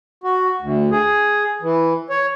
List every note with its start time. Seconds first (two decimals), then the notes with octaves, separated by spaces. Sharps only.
0.24 F#4
0.61 D2
0.91 G#4
1.62 E3
2.10 C#5